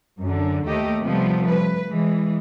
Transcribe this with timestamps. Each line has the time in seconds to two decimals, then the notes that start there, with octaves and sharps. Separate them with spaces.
0.20 F#2 D3
0.66 D#2 A3 G4 D#5
1.02 C3 F3 G3 A3 B3
1.50 B4
1.89 E3 G#3